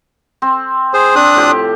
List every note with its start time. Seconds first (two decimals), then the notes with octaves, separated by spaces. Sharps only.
0.42 C4
0.94 G#4 C5
1.16 C4 D4 D#6 F#6
1.35 A2 F3 G4